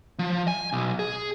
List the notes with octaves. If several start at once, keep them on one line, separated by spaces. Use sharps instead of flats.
F3
G#5
B1
G#4